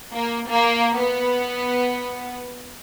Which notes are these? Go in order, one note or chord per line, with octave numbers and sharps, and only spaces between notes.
A#3
A#3
B3